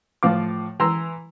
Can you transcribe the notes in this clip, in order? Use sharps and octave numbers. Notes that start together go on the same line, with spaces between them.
A2 F3 F5 D6
E3 A#5 C6 E6